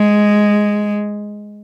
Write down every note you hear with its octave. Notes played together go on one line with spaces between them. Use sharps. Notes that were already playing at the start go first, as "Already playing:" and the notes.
Already playing: G#3